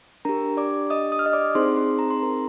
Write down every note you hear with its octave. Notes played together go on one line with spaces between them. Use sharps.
D4 G4 A#4 A#5
D5 D6
D#5 D#6
D#6
F6
D#5 D#6
D5 D6
C4 D#4 G#4 C5 C6
C5 C6
A#5
C6
A#4 A#5